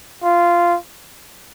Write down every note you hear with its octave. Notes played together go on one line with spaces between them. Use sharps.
F4